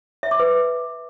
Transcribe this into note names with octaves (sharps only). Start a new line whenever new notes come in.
E5
D6
B4